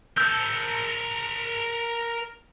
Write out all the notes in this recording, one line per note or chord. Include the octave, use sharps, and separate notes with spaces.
A#4 A5 E6 G6